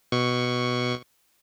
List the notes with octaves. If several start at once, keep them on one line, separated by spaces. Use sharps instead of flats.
B2 C#6